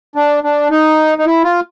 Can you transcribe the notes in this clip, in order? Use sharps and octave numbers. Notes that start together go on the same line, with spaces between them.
D4
D4
D#4
D#4
E4
F4